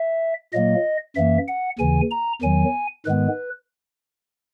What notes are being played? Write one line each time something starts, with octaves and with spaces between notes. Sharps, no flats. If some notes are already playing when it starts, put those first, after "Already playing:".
Already playing: E5
A#2 F#3 A#3 D#5
F#2 E3 A#3 E5
F#5
D#2 C#3 E3 G#5
A#5
E2 D#3 F#3 G#5
G#2 D#3 G#3 B3 B4